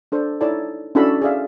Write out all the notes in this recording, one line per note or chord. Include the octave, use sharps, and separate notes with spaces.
D4 A4 C5
D#4 E4 A4 C#5 D5 A5
C#4 D4 E4 F#4 A4 B5
G#4 D5 E5 F5